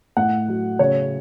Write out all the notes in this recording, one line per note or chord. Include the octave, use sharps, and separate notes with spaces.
A2 F#5
F#3
C#3 C#5